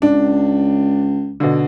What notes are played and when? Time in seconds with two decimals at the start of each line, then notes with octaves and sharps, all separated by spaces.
0.02 C#2 D4
1.40 B2 D3